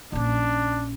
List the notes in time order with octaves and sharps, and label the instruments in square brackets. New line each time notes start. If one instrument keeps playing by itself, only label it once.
[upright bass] A#1 C#4 [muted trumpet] D4